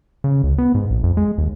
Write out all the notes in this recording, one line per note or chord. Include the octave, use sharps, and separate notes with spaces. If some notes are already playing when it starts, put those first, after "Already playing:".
C#3
C#2
B3
G#2
A#1
F2
G#3
D#2